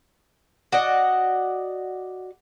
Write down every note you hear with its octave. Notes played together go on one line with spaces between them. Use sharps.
F#4 D5 D#5 F#5